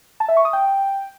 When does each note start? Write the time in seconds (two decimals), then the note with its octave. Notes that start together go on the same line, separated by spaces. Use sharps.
0.20 A5
0.28 E5
0.37 C#6
0.45 D#6
0.53 G5